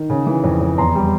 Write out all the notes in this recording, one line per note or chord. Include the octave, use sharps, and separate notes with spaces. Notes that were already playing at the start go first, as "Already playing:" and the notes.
Already playing: D#3
C#3
E3
F2
F2
E2 A#5 C6
G3